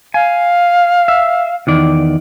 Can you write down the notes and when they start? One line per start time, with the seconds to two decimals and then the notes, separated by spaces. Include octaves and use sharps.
0.14 F5 G#5
1.08 E5
1.67 E2 D#3 D5